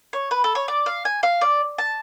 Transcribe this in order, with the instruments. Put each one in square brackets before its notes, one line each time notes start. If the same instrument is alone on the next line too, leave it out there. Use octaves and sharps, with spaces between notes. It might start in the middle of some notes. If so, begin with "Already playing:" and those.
[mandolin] C#5
B4
A4
C#5
D5
F5
G#5
F5
D5
A5